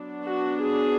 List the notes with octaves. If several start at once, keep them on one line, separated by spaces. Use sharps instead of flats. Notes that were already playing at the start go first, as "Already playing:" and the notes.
Already playing: F#3 B3 D4
F#4
G#4